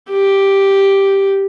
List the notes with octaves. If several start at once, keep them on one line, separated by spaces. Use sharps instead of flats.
G4